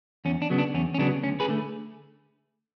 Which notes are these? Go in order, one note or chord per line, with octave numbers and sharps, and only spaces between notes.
E2 C#4
D4
C#3 F#3 B3
D4
E2 C#4
C#4
C#3 F#3 B3 D4
D2 C#4
G#4 B4
D3 A3